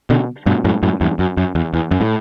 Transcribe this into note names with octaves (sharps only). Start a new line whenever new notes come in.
B2 D3
G2 B2
F#2 A2
F#2 A2
E2 G2
F#2
F#2
E2
E2
F#2
A2